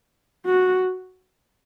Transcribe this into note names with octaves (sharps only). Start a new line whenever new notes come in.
F#4